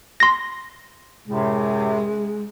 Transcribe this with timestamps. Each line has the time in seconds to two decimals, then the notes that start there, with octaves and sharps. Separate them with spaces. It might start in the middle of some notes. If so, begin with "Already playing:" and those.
0.20 C6 A#6
1.28 F#2 A2 C3 G#3